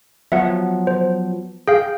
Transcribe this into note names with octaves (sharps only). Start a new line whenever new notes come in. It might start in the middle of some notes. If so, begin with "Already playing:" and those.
F3 F#3 B3 E5 F#5
C5
G#4 F5 G5